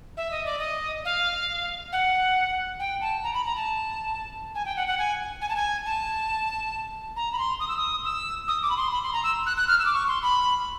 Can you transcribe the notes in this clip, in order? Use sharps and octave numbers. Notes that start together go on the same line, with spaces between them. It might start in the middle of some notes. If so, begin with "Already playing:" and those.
E5
D#5
D5
D#5
F5
F#5
G5
A5
A#5
B5
A#5
A5
G#5
G5
F#5
F#5
G#5
G#5
A5
G#5
A5
A#5
B5
C6
D#6
E6
D#6
E6
D#6
D6
B5
C6
B5
C6
A#5
E6
F#6
F#6
F6
E6
D6
C#6
C6
B5